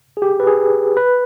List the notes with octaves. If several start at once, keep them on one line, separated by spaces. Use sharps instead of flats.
G#4
G4
B4
G#4
B4